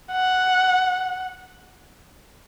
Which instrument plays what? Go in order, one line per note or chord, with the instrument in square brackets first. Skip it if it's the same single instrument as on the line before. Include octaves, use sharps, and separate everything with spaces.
[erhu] F#5